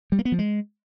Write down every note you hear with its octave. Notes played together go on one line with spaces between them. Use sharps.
G3
A#3
B3
F3
G#3